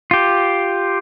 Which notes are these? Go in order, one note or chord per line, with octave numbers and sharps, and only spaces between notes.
F4 G4